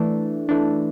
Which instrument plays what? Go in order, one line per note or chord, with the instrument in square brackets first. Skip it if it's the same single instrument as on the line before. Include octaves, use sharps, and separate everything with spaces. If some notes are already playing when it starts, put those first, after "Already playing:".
Already playing: [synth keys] E3 A3 D4
E3 A3 D4